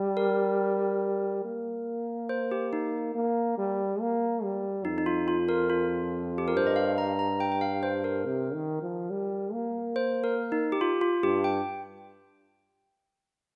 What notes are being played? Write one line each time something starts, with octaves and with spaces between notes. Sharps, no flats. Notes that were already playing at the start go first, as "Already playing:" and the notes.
Already playing: G3
A#4
A#3
C5
G4
D#4
A#3
G3
A#3
G3
F2 D#4
D#4
F4
F4
A#4
F4
G4
A#4
G2 C5
D#5
F5
A#5
A#5
G5
G5
F5
C5
A#4
C3
D#3
F3
G3
A#3
C5
A#4
D#4
G4
F4
F4
G2 G4
G5